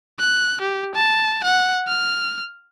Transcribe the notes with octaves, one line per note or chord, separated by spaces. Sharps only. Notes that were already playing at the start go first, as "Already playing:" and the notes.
F#6
G4
A5
F#5
F6